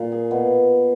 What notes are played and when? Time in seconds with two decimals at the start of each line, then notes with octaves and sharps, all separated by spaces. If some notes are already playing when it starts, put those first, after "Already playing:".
Already playing: A#2
0.12 G#4
0.31 B2